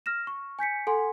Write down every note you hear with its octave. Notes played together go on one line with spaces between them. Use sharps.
F6 A#6 E7
C#6
G#5 G6 B6 C#7
A4 F#5 G#5 C6